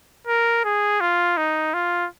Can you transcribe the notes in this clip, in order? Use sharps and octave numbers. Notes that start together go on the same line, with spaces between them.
A#4
G#4
F4
D#4
F4